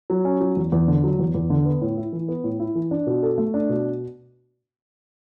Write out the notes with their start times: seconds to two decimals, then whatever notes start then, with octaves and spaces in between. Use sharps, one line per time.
0.10 F#3
0.25 C#4
0.41 F#3
0.56 E2
0.72 E2
0.88 D3
1.04 F#3
1.19 E2
1.34 E2
1.50 D3
1.66 B3
1.81 A2
1.97 E4
2.13 E3
2.28 B3
2.44 A2
2.60 E4
2.75 E3
2.91 D4
3.07 B2
3.23 A4
3.38 A3
3.54 D4
3.69 B2